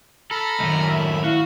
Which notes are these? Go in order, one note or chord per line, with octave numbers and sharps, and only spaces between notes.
A4 A#5 B5 F6
F#2 A2 D#3
E5 B5
E4 F#4 F5